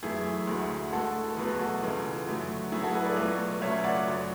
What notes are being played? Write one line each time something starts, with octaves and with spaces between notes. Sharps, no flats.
F#2 E3 A3 E4 G#4
D2 D3 G#3
A2 G#3 F#4 A4
A4
E2 B2 F#3 A3 G#4 B4
F#4 A4
C#2 C#3 E3 G#3
F#2 D3 F#3 A3
A2 F#3 A3 E4 G#4
F#4 A4
G#4 B4
B4 D5
C#2 B2 F#3 A3
C#2 C#3 F#3 A3 C#5 E5
D5 F#5
F#2 D3 F#3